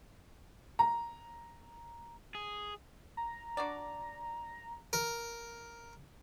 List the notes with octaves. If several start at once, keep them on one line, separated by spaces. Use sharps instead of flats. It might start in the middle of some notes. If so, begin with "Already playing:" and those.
A#5
G#4
A#5
D4 F#4 D5
A#4